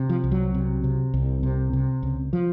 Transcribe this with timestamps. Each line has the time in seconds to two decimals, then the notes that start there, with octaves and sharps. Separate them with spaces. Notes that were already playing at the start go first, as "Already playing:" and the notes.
Already playing: C3
0.09 F3
0.24 C2
0.32 F#3
0.55 C3
0.84 C3
1.14 C2
1.43 C3
1.73 C3
2.03 C#2
2.33 F3